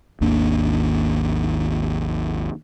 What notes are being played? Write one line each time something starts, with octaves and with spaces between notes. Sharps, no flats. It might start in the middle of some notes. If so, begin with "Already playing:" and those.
G#1 D#2 A#3 D4